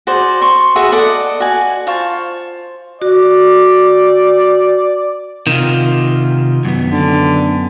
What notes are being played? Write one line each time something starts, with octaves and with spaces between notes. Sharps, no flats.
F#4 G#4 C5 D5
C6 C#6
F#4 G#4 B4 E5
A4 D5 D#5 F#5
F#4 D5 G#5
F4 C5 A5 C#6
F#4 D5
C3 D#3 F4
F#2 B3
D3